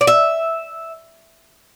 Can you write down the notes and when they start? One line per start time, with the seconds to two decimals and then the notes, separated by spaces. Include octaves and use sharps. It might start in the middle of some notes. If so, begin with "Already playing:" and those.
0.01 D5
0.07 E5